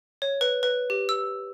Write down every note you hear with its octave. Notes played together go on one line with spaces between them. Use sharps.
C#5
B4
B4
G4
E6